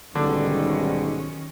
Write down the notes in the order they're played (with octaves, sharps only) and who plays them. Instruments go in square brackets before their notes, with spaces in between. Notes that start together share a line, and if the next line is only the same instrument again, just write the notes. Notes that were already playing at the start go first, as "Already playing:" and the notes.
[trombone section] B1 G#2 G3 [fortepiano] D3 [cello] D#3 C#4